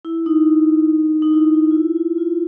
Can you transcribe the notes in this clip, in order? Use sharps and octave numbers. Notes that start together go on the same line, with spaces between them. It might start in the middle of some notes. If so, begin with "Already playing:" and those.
E4
D#4
D#4
E4
E4
F4
E4
F4
F4